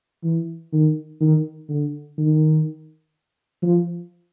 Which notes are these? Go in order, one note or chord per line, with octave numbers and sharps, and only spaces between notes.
E3
D#3
D#3
D3
D#3
F3